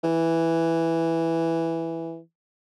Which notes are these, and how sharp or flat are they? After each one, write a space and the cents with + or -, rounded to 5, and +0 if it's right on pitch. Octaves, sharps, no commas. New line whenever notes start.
E3 +0